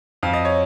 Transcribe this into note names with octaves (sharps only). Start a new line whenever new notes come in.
F2 F5
D#5
C#5